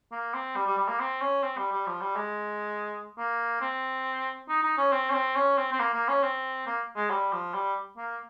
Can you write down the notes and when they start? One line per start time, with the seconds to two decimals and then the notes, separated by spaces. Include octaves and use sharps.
0.12 A#3
0.34 C4
0.56 G3
0.67 G3
0.78 G3
0.88 A#3
1.00 C4
1.21 C#4
1.43 C4
1.58 G3
1.72 G3
1.87 F3
2.01 G3
2.15 G#3
3.18 A#3
3.61 C4
4.49 D#4
4.63 D#4
4.78 C#4
4.92 C4
5.10 C#4
5.14 C4
5.36 C#4
5.58 C4
5.72 C4
5.80 A#3
5.94 A#3
6.08 C#4
6.23 C4
6.67 A#3
6.96 G#3
7.10 G3
7.32 F3
7.54 G3
7.97 A#3